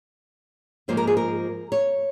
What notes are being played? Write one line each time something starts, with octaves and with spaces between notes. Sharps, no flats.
G#2 F3 A#3 F4 C5
A#4
G#4
A#4
C#5